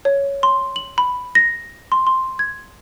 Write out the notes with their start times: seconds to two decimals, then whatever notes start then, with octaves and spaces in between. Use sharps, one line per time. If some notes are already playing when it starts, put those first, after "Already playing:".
0.05 C#5
0.43 C6
0.76 F#7
0.98 B5
1.35 A#6
1.92 C6
2.07 C6
2.39 G#6